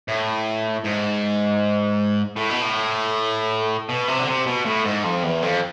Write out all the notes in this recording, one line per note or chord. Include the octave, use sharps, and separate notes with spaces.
A2
G#2
A2
B2
A2
B2
C3
D3
C3
B2
A2
G#2
F2
E2
F2